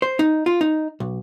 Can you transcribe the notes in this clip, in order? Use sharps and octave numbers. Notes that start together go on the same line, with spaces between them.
C5
D#4
F4
D#4
B1